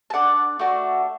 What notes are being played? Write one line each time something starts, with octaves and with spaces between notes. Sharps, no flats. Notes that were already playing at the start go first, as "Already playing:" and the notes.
A5
D4 A4 D5 F#5
A3 D4 F#4